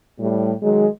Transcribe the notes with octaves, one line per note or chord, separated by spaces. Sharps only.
A2 G3
D#3 F#3 G#3